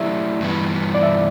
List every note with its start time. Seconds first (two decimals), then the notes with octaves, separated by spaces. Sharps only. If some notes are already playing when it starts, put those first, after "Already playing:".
Already playing: F#3 A3 E4 G4 D5 E5
0.40 G2 E3 B3
0.95 D5
1.03 E5